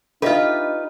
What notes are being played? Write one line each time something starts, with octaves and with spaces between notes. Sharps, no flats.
D4 D#4 F4 G4 A4 B4 D#5 E5